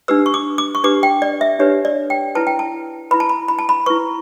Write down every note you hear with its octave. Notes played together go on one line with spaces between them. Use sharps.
D4 G4 B4 E6
C#6
D6
D6
C#6
D4 G4 B4 D6
G5
D5
E5
D4 G4 B4 C#5
D5
G5
E4 B4 A5
G5
A5
E4 B4 B5
A5
B5
B5
A5
B5
E4 B4 C#6